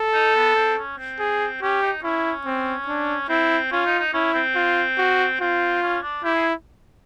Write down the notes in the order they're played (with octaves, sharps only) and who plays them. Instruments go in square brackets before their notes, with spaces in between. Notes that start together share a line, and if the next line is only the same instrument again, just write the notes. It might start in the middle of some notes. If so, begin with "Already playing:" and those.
Already playing: [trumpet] A4
[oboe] D#4
B3
C4
C#4
C4
[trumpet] G#4
[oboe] C#4 [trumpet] G4
[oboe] D#4
[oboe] C#4 [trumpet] E4
[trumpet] C4
D4
[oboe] C4 [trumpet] E4
[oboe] C#4 [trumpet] F4
[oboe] D#4
D#4
[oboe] C#4 [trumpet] E4
[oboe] C4
[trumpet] F4
F#4
[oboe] C4 [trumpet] F4
[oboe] C#4
D4
[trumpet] E4 [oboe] G4
[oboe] G#4